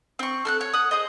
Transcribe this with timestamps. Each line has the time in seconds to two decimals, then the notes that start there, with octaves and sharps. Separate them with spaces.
0.19 C4 C#6
0.45 A4 F6 F#6
0.61 C#5
0.73 F#5 D#6
0.91 G#4 C5 D#5